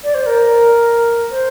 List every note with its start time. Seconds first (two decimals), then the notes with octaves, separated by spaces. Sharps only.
0.04 D5
0.15 C5
0.26 A#4
1.31 C5